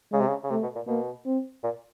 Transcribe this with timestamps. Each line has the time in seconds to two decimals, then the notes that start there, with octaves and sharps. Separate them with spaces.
0.12 C#3 G#3
0.20 C3
0.28 C#3
0.44 C#3
0.50 C3 A3
0.63 B2
0.75 A#2
0.87 B2 A#3
1.26 C4
1.64 A#2